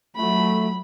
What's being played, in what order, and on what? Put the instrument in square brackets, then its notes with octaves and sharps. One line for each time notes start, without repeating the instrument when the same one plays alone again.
[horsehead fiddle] F#3 B5 [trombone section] A3